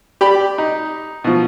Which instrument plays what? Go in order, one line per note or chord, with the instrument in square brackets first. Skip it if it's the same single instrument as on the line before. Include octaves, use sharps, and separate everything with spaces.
[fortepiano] G4 D5 B5
D#4
B2 F3